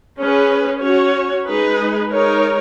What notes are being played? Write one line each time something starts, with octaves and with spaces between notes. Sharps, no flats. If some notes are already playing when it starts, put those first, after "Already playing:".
C#4 G#4 B4
C#4 F#4 C#5
G#3 D#4 G#4 B4
G#3 D#4 A#4 C#5